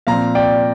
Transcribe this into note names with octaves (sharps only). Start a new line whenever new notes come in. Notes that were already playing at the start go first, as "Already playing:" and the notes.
A#2 F3 C4 F5 A#5
D5 G5